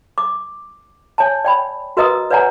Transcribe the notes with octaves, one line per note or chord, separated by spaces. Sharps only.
D6
C#5 G#5 A5
D5 G5 B5
F#4 A#4 B4 D#5 A#5 D#6
B4 C#5 D5 F#5 G#5 A#5